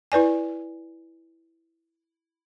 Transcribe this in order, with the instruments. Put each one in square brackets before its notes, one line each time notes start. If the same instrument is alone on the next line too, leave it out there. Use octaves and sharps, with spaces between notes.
[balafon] E4 B4 D5 G#5